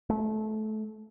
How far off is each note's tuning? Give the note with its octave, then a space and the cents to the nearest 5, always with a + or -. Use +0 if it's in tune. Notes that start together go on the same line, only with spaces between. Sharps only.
A3 -25